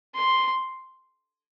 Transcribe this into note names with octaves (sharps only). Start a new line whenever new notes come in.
C6